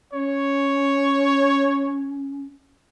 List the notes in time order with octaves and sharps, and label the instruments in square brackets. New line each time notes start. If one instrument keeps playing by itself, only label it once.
[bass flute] C#4 [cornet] C#5